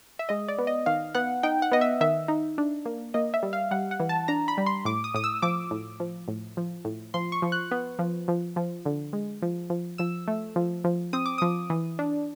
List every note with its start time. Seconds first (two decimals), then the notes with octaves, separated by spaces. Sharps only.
0.19 E5
0.29 G#3 D#5
0.48 D5
0.58 B3
0.67 D#5
0.86 D#3 F5
1.15 B3 F#5
1.43 D#4 G5
1.62 F#5
1.72 B3 D#5
1.81 E5
2.01 D#3 E5
2.28 D#4
2.58 D4
2.86 A#3
3.14 A#3 D#5
3.34 E5
3.43 G3
3.53 F5
3.71 G3 F#5
3.91 F#5
4.00 E3
4.09 A5
4.28 D4 A#5
4.48 B5
4.58 G3
4.66 C6
4.85 A2 D6
5.04 D#6
5.14 A2 D#6
5.24 E6
5.42 F3 D6
5.71 A2
6.00 F3
6.28 A2
6.57 F3
6.85 A2
7.14 F3 C6
7.32 C#6
7.42 F3
7.52 F#6
7.71 B3
7.99 F3
8.28 F3
8.56 F3
8.86 D3
9.13 G#3
9.42 F3
9.70 F3
9.98 F3 E6
10.28 A3
10.56 F3
10.84 F3
11.13 C4 D#6
11.26 D6
11.38 F3 D#6
11.70 E3
11.99 D4